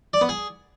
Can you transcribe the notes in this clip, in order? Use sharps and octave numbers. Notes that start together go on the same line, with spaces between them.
D5
B3
G#4